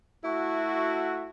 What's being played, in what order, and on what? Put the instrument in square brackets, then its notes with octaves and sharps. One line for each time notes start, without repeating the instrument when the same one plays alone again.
[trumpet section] A3 F#4 [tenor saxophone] E4